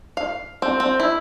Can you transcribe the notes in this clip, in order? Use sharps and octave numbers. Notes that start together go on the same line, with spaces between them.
F5
C4
C4
E4